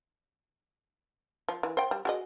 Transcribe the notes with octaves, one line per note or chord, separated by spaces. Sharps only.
F3
E3
C5 G5
G3
F#4 G#4 D#5